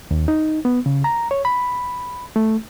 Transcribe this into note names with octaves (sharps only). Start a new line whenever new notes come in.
D#2
D#4
B3
C#3
A#5
C#5
B5
A3